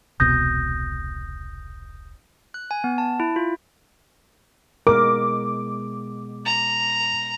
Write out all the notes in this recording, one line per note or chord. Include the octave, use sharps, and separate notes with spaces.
E1 C2 B2 D#6 G6 A#6
F#6
G#5
B3
A5
E4
F4
B2 G#3 A#4 D6
A#5